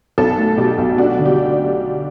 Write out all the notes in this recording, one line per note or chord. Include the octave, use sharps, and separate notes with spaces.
B1 A4
A3
B2 G4
B1
D4 F#4
D3
G4